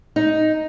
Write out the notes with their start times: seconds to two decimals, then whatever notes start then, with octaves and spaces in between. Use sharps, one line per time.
0.16 D#4